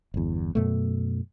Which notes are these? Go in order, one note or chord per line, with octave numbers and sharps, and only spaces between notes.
G1 E2
F#2 B2 A3